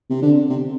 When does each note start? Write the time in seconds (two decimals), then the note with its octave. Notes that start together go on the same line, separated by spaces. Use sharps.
0.10 C3
0.22 D3
0.50 C3